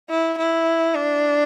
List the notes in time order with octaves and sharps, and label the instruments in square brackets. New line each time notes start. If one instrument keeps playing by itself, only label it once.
[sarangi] E4
E4
D4